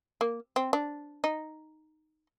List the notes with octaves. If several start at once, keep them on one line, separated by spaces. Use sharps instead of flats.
A#3
C4
D4
D#4